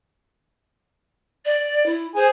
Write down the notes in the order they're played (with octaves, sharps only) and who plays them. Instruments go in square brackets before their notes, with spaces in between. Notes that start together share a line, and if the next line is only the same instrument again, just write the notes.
[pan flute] D5
E4
[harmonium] G#4 G#5 [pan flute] C5